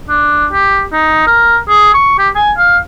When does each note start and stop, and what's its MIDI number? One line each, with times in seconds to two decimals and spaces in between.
0.09 0.46 62
0.52 0.84 67
0.92 1.24 63
1.27 1.57 70
1.68 1.93 68
1.94 2.18 85
2.18 2.29 67
2.35 2.51 80
2.58 2.78 77